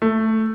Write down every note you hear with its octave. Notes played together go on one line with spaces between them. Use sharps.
A3